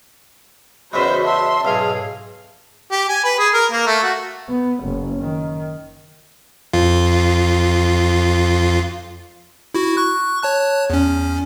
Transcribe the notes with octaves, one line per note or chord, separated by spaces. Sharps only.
E2 C#3 G#3 F#4 C5 E5 B5
E5 A5 C6
B1 G#2 G#4 F5
G4
G#5
B4
G#4
A#4
A#3
A3
F#4
B3
F#1
D#3
F2 F4
E4 F#4
C#6 F#6
C#5 A5 F#6
E2 C#4